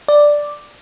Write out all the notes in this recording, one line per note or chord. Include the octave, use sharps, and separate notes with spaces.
D5